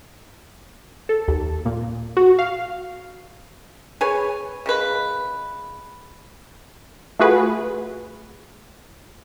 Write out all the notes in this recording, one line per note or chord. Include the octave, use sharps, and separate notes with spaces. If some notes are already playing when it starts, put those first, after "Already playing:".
A4
D#2
A#2
F#4
F5
G#4 B4 C#5 G#5
C#3 G#3 B4 B5
A3 F4 F#4 G#4 B4